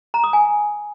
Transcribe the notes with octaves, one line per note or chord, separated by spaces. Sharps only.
A#5
D#6
G#5